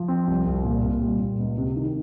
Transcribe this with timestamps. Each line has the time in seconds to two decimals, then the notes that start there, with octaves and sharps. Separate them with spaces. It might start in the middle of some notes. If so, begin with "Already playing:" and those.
Already playing: F3
0.08 C4
0.27 C2
0.46 C2
0.64 A#2
0.84 A#2
1.02 G3
1.20 A#2
1.39 C#2
1.58 C3
1.76 D#3